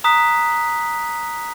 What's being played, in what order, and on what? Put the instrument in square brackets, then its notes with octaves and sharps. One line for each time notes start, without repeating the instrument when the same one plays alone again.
[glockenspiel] A#5 D#6 F#6 B6